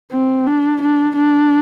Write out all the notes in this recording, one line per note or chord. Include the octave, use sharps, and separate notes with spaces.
C4
D4
D4
D4